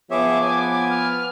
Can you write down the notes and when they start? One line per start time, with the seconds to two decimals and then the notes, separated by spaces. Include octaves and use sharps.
0.11 F3 B3 G#4 C#5 E5 D6
0.41 G#5
0.90 F6